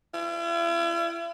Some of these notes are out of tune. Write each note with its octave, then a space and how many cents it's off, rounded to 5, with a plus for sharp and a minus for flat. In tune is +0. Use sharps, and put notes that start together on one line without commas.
E4 +45